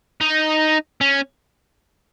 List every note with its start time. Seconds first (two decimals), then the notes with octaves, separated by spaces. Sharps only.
0.21 D#4
1.01 C#4